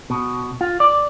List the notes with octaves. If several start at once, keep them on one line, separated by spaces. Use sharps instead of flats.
B2
F4
D5